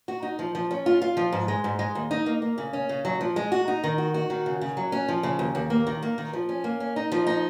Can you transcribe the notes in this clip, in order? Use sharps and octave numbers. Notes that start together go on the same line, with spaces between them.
F#4
D#4
F3
F3
C#4
F4
F4
F3
G#2
G#3
G#2
G#3
D#2
D#4
A#3
A#3
C#3
C#4
C#3
F#3
F3
G#3
F#4
D#4
D#3
F#4
F#4
D#3
C#3
C#3
F#3
C#4
F3
C#3
D#2
D#2
A#3
D#3
A#3
D#3
F3
C#4
A#3
C#4
D#4
F3
D#4